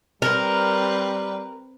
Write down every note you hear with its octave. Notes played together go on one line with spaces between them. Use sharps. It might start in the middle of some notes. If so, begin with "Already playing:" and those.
G3 C4 A#4 B4